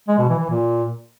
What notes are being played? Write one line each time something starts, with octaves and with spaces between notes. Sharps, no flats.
G#3
B2
E3
E3
A#2